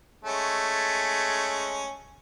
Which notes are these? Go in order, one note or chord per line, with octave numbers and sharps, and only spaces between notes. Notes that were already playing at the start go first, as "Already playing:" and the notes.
G#3 A3 C#4